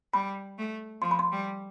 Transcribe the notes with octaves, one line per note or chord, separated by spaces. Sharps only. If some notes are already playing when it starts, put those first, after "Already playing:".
G3 B5
A3
F3 C6
B5
C6
G3